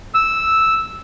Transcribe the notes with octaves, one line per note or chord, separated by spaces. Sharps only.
E6